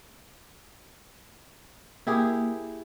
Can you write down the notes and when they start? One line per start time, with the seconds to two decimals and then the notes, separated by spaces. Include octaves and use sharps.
2.07 A#3 E4 G4 G#4